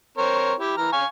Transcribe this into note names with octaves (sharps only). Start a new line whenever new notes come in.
C4 A#4 C#5
E4 G4
E3 A#5 F6
F5 G#5 C#6